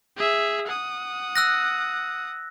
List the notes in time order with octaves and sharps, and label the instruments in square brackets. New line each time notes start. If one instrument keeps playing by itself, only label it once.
[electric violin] G#4 E5
F#5 D#6
[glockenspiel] E6 F#6 A#6